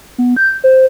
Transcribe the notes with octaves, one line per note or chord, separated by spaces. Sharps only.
B3
G6
C5